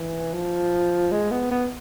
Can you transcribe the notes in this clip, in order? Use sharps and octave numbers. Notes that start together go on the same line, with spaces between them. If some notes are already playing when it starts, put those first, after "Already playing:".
Already playing: E3
F3
G#3
B3
B3